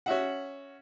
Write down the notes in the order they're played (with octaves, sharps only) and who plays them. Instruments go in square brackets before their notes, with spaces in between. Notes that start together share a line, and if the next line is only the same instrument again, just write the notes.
[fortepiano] C#4 F#4 E5 F#5